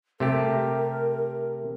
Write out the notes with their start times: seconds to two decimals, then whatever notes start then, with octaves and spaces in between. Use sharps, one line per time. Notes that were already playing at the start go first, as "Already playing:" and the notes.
0.20 C3 A3 G4 A#4